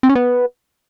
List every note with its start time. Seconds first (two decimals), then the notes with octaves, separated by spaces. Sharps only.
0.03 C4
0.09 C#4
0.15 B3